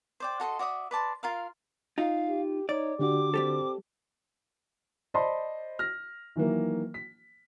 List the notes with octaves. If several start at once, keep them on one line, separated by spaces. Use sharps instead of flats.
C5 D5 G5
F#4 A4 D#5 C6
F#4 D5 E5 D#6
B4 D5 A5 C6
F4 A#4 F5
D#4 F4 F5
G4
D#4 C#5 D5
D3 D4 F#4 G4 D6
G3 C4 G4 A4
C5 D5 D#5 A5 B5 C6
F6 A#6
D#3 E3 F#3 A#3
B6